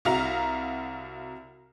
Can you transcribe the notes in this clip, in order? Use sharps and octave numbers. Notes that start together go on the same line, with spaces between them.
C2 F#4 E5 F5 A#5 F7